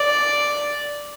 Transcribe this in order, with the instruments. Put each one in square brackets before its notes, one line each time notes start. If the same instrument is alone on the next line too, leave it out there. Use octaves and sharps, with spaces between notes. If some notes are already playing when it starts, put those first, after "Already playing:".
Already playing: [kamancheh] D5